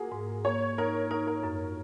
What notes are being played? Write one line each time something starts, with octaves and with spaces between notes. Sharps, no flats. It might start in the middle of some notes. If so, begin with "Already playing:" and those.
Already playing: A#3 F#4 G#4
G#2
A#3 C#5
D#4 A#4
D#4 A#4
A#4
F#2 A#4